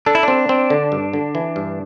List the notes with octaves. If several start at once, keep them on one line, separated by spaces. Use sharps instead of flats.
D4 A4
E4
C4 D4
C4
D3
G2
D3
E3
G2